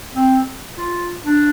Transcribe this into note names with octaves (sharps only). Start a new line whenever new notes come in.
C4
F4
D4